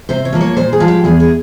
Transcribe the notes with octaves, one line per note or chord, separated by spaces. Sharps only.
C3 C5
C#5
F3 A#3
C#5
A#2 C5
G#4
F3 G#3
G4
E2 G#4
G#4